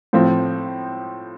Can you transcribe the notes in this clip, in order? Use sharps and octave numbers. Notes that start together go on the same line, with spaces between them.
A2 F3 C4